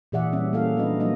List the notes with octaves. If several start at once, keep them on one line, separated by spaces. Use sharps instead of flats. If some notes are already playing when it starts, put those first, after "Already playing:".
A#2 E3 G#4 D5 E5 F#5
G3 C#4 E5
A#3 C#4 E4 G#4 A4 F5
F3 B3 D4 F#4 B4 D#5
F3 F#3 A#3 D#4 D#5